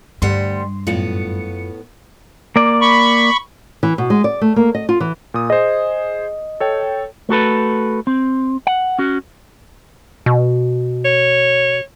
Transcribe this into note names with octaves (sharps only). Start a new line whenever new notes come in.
D2 G2 G3 F#5 C6
F#2 A2 B3 F4 C#7
A#3 D5
B5 C#6
E3
B2
G#3
D5
A3
A#3
D#5
F4
E3
A#2 D#6
G#4 C5 D#5
A4 C#5 G5
A3 F#4 A4 B4
C4
F#5
C#4 F#4
B2
C#5